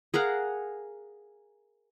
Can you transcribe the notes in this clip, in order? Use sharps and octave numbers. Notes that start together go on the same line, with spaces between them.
G#4 A#4 F5 F#5